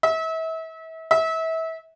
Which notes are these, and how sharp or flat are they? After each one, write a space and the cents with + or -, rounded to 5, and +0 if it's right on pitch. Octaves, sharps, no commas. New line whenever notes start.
E5 -35
E5 -30